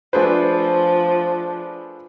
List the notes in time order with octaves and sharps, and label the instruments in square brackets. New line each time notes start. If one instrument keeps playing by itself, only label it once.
[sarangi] F3 [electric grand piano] A3 G#4 C5 [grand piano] D4 B4